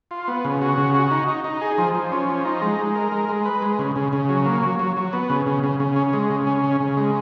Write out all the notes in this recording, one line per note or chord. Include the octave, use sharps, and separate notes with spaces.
F4
B3
C#3
F#4
C#3
F#4
D#4
D#4
D#4
G#4
F3
F3
C#4
F3
D#4
G#3
G#3
A#4
G#3
G#3
B4
G#3
C#3
C#3
C#3
F#3
A#3
F#3
F#3
F#3
B3
C#3
C#3
C#3
C#3
C#4
G#3
C#3
C#4
C#3
C#3
G#3